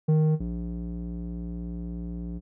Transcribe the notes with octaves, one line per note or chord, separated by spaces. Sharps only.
D#3
A#1